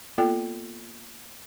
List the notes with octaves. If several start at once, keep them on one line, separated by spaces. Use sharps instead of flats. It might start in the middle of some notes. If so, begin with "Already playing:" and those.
A#3 B3 F4 A4 D5 G5